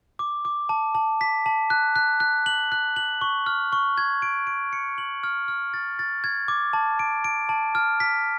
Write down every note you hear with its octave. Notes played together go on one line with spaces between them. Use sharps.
D6
D6
A5
A5
B6
A5
F#6
F#6
F#6
F#7
F#6
F#7
C#6
F6
C#6
G#6
D7
D7
C#7
F#7
F6
F6
A6
A6
G#6
D6
A5
D7
D7
A5
F6
B6